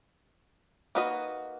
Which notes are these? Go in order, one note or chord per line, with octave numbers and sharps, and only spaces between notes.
A#3 D#4 F#4 B4 D#5